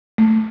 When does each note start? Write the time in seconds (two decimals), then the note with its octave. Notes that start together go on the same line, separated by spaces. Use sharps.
0.18 A3